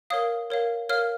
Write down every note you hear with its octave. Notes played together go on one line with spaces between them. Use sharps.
A#4 C#5 F5 D#6
A#4 C#5 F5
A#4 C#5 F5 F6